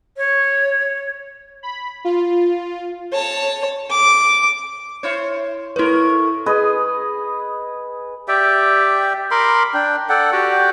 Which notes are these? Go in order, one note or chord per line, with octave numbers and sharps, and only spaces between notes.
C#5
B5
F4
C#5 A5
D6
E4 C5 C#5
A2 E4 A#4 B4
G#4 B4 D#5
G4 D5 E5 G5
A#4 B5 C6 D6
D4 G5
A4 D5 F#5 G5
F#4 G4 D5 G5